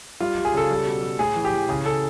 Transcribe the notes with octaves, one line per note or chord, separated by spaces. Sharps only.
G3 F4
G3
G#4
C#3 A4
G3
B2
G3
A2 G#4
E3
G4
E3
C#3 G#4
C#3 A4